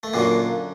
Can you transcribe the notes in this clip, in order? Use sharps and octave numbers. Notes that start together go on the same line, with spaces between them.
A3
F#2 A#2 D3 F#3 A#3